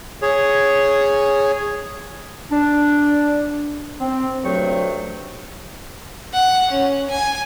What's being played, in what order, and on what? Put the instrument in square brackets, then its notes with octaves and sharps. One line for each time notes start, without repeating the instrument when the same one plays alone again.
[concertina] G#4 C#5
[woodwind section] D4
C4
D2 G2 F#3 A3 G5 C#6
[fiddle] F#5
C#4
G#5